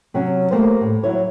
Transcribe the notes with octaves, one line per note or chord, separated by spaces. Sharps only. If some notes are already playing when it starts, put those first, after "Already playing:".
C3 F#3 C#4
A3 A#3 G4 A#4 C5
A2
F#3 E4 C#5